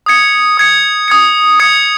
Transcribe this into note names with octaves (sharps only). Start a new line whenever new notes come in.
D#6 G#6 C#7
D#6 G#6 C#7
D#6 G#6 C#7
D#6 G#6 C#7